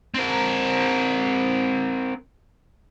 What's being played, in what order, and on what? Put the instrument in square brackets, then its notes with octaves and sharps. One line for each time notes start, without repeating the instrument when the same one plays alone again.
[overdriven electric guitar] C4 A#4